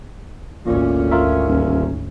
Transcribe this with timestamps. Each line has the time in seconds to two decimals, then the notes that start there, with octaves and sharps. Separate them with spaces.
0.66 G#1 D2 A#2 C#4
1.11 F4 A#4 E5
1.47 D#1